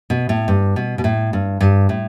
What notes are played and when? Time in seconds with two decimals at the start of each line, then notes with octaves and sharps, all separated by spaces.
0.10 B2
0.29 A2
0.48 G2
0.76 B2
0.98 B2
1.04 A2
1.33 G2
1.61 G2
1.89 A2